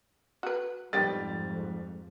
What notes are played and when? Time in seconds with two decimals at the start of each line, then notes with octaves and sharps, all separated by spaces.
0.43 F#4 B4
0.93 F2 G#2 D#3 G3 B3 G4 A6